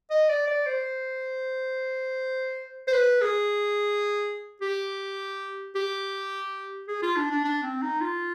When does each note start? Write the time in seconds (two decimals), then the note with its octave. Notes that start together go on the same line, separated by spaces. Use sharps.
0.11 D#5
0.29 D5
0.47 D5
0.66 C5
2.88 C5
2.93 B4
3.22 G#4
4.61 G4
5.75 G4
6.88 G#4
7.03 F4
7.17 D4
7.31 D4
7.44 D4
7.63 C4
7.82 D#4
8.01 F4